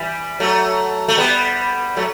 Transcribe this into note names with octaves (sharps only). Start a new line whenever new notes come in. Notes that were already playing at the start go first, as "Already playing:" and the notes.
Already playing: E3 G3
F#3 A3
A3
G3 B3
F#3 A3